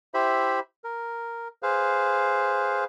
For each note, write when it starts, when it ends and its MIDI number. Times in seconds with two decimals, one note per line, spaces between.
0.14 0.60 64
0.14 0.60 67
0.14 0.60 72
0.14 0.60 76
0.14 0.60 83
0.84 1.48 70
1.63 2.84 68
1.63 2.84 71
1.63 2.84 72
1.63 2.84 77